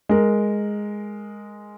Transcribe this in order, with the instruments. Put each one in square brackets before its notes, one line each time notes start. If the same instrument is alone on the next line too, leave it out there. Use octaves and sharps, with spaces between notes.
[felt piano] G#3 A#4